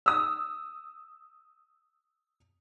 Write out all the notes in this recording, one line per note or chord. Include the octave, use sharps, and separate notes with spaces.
D#6 E6